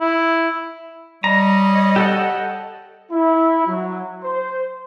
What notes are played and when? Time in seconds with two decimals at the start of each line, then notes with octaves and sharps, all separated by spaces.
0.01 E4
1.24 G3 C#5 D#5 A#5
1.96 G4 A4 F#5
3.11 E4
3.67 F#3
4.22 C5